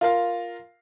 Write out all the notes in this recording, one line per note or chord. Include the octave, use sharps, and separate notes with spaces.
F4 A#4 F5